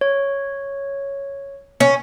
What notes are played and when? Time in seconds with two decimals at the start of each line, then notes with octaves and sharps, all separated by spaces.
0.01 C#5
1.80 C#4